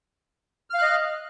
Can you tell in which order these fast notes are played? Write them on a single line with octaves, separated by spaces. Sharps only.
F6 F5 F#6 D#5